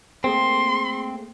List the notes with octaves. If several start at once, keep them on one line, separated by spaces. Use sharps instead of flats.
A3 A#3 C4 G#4 C6